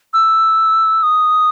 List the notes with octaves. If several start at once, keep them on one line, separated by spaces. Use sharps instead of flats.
E6
D#6